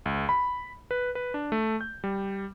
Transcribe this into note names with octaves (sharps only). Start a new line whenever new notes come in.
C#2
B5
B4
B4
D4
A3
G6
G3